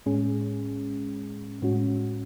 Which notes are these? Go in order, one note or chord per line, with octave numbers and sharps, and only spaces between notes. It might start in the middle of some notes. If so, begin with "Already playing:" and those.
A2 G#3 C#4 G#4
A2 G#3 C#4 F#4